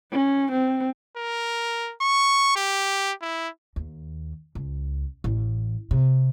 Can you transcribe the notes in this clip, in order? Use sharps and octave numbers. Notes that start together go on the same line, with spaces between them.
C#4
C4
A#4
C#6
G4
E4
D#2
C#2
A1
C3